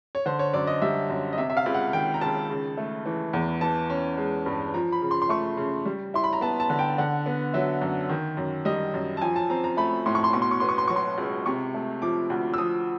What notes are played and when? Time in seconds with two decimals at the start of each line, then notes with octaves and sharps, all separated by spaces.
0.15 C#5
0.26 D3 C5
0.39 C#5
0.53 F#2 D5
0.67 D#5
0.82 G3 E5
1.10 F#2
1.33 D#5
1.38 C3 E5
1.50 E5
1.57 F5
1.66 C#2
1.74 F#5
1.93 D#3 G5
2.14 A#5
2.21 C#2 A5
2.50 C#3
2.77 A3
3.06 E3
3.33 E2
3.61 E3 A5
3.90 C#4
4.18 G#3
4.46 G2
4.74 F3 A#5
4.92 B5
5.02 C#3
5.11 C6
5.22 C6
5.29 A3 C#6
5.57 C#3
5.85 G3
6.14 E4 C6
6.24 B5
6.33 A#5
6.41 B3 A5
6.60 A5
6.70 D3
6.79 G5
6.98 D3 F#5
7.26 B3
7.54 F#3 E5
7.82 F#2
8.10 D#3
8.37 F#2
8.65 G3 D#5
8.94 F#2
9.17 A5
9.21 F3 G#5
9.36 A5
9.50 C4 A#5
9.64 A#5
9.77 A3 B5
10.06 A2 C6
10.15 C#6
10.24 C6
10.33 B2 C#6
10.42 C6
10.51 C#6
10.60 B3 C6
10.69 C#6
10.78 C6
10.88 F#3 C#6
10.96 C6
11.18 C#2
11.46 C3 C#6
11.74 A3
12.02 F3 D6
12.30 D2
12.54 E6
12.58 F3 D#6